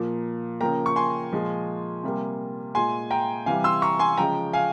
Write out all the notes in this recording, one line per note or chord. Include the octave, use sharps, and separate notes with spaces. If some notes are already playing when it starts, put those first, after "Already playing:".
Already playing: A#2 F3 A#3
C#3 F3 A#3 G5 A#5
C#6
G#5 C6
A#2 F3 G#3
C3 G3 A#3
A#2 G#3 G#5 C6
G5 A#5
C3 E3 G3 F5 G#5
C6 E6
A#5 C#6
G#5 C6
C#3 F3 G#3 G5 A#5
F5 G#5